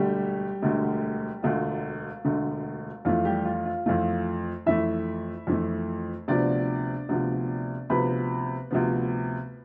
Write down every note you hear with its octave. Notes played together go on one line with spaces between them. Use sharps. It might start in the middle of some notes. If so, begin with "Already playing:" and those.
Already playing: E1 D2 D3 G3 A3 G4
E1 D2 D3 A3
E1 D2 D3 A3 F4
E1 D2 D3 A3
F2 E3 A3 F4
G3 G4
F4
F4
F2 E3 A3 F4
F2 E3 A3 E4 E5
F2 E3 A3
D2 C3 F3 B3 D4 D5
D2 C3 F3 B3
D2 C3 F3 B3 B4 B5
D2 C3 F3 B3